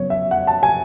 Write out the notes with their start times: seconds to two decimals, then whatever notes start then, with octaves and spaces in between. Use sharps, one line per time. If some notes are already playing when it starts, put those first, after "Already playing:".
Already playing: F#2 C#3 F#3 B3 C#5
0.10 E5
0.31 F#5
0.47 A5
0.63 G#5